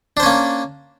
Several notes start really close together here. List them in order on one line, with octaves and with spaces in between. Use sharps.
D4 C5 C#4 A#3